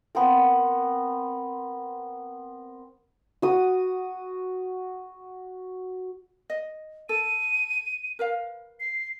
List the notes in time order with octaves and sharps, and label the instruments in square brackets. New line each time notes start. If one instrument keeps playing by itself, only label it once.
[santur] B3 C4 A#4
F#4 D#6
[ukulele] D#5
[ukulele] A4 [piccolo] D#7
[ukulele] A#4 B4 F5
[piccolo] C7